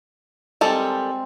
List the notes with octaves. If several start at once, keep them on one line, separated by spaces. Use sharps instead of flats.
D#3 G3 G#3 C4 A4